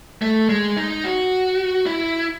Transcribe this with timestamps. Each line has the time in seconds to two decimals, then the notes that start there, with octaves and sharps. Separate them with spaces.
0.22 A3
0.49 G#3
0.77 D#4
1.04 F#4
1.86 E4